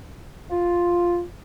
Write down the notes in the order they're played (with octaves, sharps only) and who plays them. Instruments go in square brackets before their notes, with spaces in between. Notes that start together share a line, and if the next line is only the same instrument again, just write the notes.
[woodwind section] F4